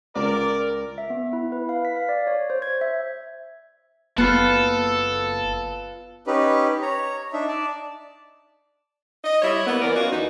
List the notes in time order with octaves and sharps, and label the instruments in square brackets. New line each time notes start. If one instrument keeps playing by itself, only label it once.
[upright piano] C#2 [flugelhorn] A#4 [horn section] D5
[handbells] E5
B3
E4
B4
F5
B6
F5
D5
C#5
C5
G#6
E5
[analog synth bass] F#1 [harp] B3 F4 [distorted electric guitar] A4
[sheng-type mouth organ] C#4 D#4 G4 B4
C#5 A#5
D4 D#4 E5
D5 A5
[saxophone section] D#5
G3 E4 C#5 E5
A#3 B3
E3 A#4 D5
C#4 F4 F#4 B4 D#5
D#2 E3 D#4